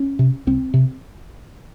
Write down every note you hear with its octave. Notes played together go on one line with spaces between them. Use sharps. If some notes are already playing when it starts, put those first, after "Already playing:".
Already playing: C#4
C3
C2 C4
C3